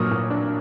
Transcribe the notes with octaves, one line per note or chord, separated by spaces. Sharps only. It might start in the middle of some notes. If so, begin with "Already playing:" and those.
Already playing: A#2 F#3 C#6 D#6 F6
A#2
D4